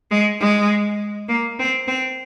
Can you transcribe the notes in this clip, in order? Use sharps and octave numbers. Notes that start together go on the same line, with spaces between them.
G#3
G#3
A#3
C4
C4